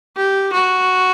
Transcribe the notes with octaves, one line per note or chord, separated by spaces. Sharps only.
G4
F#4